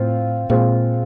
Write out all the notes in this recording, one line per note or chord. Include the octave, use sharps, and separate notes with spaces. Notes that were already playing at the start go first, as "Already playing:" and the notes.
Already playing: A2 C4 F4
A#2 G#3 C4 F4